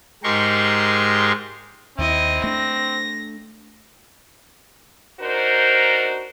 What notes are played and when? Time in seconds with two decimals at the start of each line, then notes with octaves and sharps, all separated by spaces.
0.24 G#2 G#3 G4 A#4 C6 C#6
1.98 D#2 C4 E4 D#5
2.44 A3 D4 A#6
5.21 D4 D#4 F#4 A#4 C5